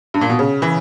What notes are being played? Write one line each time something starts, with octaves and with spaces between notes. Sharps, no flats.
G2
A#2
B2
C#3
E3